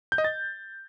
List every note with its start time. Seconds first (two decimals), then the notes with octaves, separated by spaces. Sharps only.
0.12 G6
0.18 D#5
0.24 A6